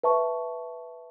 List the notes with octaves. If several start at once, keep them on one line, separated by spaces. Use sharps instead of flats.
B4 E5 A5 C#6